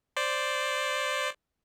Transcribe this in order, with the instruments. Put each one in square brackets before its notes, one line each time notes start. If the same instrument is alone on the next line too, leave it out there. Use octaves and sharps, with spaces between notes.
[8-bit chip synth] C5 D5